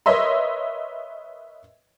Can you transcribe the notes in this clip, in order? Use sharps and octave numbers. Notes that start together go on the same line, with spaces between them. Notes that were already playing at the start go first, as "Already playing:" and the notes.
A#4 B4 C#5 D#5 E5 C6